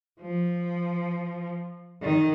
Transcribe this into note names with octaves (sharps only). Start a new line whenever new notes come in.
F3
D#3